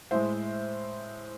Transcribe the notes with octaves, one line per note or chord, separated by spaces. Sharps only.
A2 G#3 C5 E5